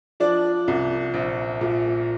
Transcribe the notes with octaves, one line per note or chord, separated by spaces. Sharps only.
F3 D4 D5
C2
A#1
A#2